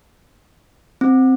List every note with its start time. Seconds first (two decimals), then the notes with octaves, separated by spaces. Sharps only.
1.01 C4